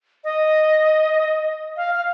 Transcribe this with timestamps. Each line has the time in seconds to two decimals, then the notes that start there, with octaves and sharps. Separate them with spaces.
0.24 D#5
1.77 F5
1.95 F5